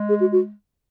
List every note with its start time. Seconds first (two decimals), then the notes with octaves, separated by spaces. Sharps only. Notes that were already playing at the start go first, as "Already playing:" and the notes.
Already playing: G#3
0.09 G#4
0.20 F#4
0.32 F#4